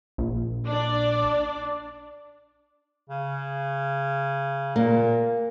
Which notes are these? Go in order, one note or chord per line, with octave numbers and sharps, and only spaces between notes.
A#1
D4 D5
C#3
A#2 A#3